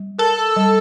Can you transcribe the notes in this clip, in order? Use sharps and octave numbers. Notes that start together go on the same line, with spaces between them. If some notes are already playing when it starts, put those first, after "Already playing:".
Already playing: G3
A4 A#4
G3